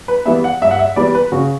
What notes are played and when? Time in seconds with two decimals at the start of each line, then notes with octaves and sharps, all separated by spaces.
0.08 B4
0.26 E3 G3 B3 E5
0.44 F#5
0.62 G2 E5
0.71 F#5
0.79 E5
0.96 E3 G3 B3 D5
1.15 B4
1.32 C#3 F#4